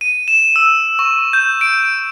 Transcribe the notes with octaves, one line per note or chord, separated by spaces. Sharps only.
D#7
E7
E6
C#6
G6
D7